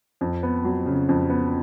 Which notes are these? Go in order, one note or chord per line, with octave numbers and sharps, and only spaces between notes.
F2
B3
F#3
C#3
F2
B3